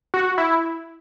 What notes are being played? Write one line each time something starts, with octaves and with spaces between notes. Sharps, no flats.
F#4
E4